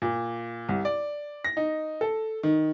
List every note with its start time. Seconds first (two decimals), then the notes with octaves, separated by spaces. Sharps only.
0.02 A#2
0.69 C2
0.85 D5
1.45 A#6
1.57 D#4
2.01 A4
2.43 D#3